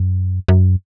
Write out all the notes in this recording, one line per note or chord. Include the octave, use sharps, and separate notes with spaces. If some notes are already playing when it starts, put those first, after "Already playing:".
Already playing: F#2
F#2